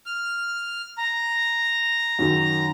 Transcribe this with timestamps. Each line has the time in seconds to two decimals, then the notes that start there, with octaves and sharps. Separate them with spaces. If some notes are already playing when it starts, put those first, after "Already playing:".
0.06 F6
0.98 A#5
2.19 F#2 D#3 F#3